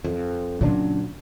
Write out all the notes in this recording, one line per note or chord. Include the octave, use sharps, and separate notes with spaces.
F2
A#2 C#3 F#3 D4